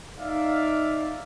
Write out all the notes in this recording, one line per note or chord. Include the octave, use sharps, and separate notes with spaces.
D#4 D5 E5 F5